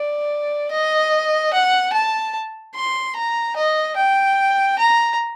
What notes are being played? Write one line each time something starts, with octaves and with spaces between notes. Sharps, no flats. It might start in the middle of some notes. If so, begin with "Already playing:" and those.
Already playing: D5
D#5
F#5
A5
C6
A#5
D#5
G5
A#5